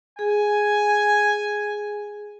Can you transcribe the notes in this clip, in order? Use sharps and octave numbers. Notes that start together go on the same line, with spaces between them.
G#4 G#5